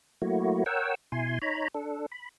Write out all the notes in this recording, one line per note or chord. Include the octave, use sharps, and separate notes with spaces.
F#3 A3 A#3 E4 F#4
A#4 C#5 F#5 G5 E6
B2 E4 G#5 C6
D#4 C#5 A#5 B5
D4 A4
B5